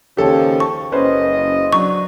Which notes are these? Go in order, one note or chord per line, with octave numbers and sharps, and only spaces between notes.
D#2 C#3 F3 G4 A4 C#5
A5 C#6
F#1 C#4 B4 C5 D#5
F#3 D4 C#6